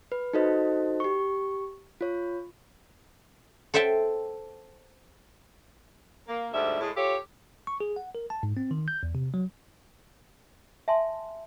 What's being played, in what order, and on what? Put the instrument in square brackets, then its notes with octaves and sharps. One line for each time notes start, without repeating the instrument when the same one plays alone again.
[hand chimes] B4
D#4 F#4 A4 C5 D#5
G4 C#6
F4 C#5
[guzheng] A4 C5 E5 G5 A5
[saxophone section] A#3
D2 G#2 G3 E5
A2 G#3
F4 G4 A4 C#5
[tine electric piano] C#6
G#4
F#5
A#4
A5
G#2
C4
D#3
G6
E2
C3
F#3
[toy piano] E5 G#5 A5 C6